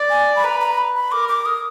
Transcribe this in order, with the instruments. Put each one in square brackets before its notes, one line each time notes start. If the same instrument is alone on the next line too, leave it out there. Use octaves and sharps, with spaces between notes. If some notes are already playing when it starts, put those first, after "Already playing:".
Already playing: [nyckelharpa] D5
[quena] G#5
B5
[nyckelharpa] B4 [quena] A#5
[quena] A#5
B5
B5
[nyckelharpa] A#4 [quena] D6
[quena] D6
D#6